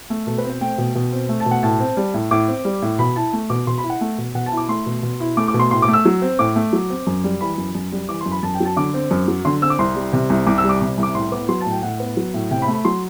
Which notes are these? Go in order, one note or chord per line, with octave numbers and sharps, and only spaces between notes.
A3
B2 A4
B4
C4
C5
A3 G5
B2
B2
C4
A3
A5
B2
F#5
A2 A5
C4
G3
A2
A2 D6
C4
G3
A2
B2 B5
E4 A5
A3
B2 D6
B2 C6
B5
E4
F#5
A3
B2
B2 F#5
A5
E4
D6
A3 C6
B2
B2
E4
A3 D6
D6
B2
C6
A2 C6
D6
A3
E6
F#3
C4
A2 D6
A3
F#3
C4
F#2
G3
E3 B5
F#2
F#2
G3
E3 D6
F#2 C6
B5
F#2 A5
G5
F#3
A5
D3 D6
C4
F#2
F#3
D3 C6
C4 E6
D6
C2 C6
G3
C3
C2
C2 D6
E6
G3
D6
C3 D6
C2
D6
A2 C6
B3 D6
F#3 C6
A5
A2
G5
A2 F#5
B3
F#3
A2
C3 G5
B5
A3
B5
F#3 C6